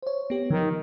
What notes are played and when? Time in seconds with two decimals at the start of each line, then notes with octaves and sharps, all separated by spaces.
0.03 C5 C#5
0.30 B3 G4
0.50 D#3 F3